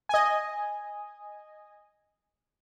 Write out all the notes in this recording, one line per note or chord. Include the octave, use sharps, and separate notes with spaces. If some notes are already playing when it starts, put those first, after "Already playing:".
D#5 G#5